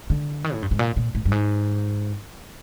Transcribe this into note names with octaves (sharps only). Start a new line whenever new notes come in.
D3
D#3
A2
G2
G#2
A#2
A#2
A2
G2
G#2